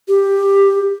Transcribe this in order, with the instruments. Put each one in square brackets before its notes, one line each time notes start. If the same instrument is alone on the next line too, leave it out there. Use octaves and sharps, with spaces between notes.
[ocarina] G4